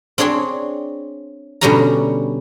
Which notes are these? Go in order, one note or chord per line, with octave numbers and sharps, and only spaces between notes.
C4 D4 G#4 C#5 C6
B2 D3 G3 C#4 G4 A#5